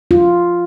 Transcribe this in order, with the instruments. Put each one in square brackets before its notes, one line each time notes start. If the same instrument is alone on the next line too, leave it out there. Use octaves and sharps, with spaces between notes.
[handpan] F4